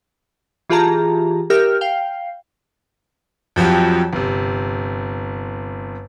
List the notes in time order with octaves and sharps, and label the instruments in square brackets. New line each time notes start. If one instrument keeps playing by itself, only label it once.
[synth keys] E3 F4 G4 G#4 A5 A#5
G4 A#4 E5 F6
F5 G5 C7
[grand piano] F2 F3 F#3 G4
G1 C3